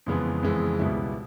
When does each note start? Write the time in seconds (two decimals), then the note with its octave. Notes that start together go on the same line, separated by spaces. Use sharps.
0.06 F2 C#3 E3 G#3 B3
0.43 F2 C#3 E3 G#3 B3
0.79 C#2 B2 G3 B3 E4